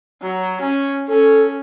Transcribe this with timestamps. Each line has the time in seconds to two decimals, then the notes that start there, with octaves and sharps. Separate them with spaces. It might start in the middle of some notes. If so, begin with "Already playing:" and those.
0.22 F#3
0.61 C#4
1.08 C#4 A4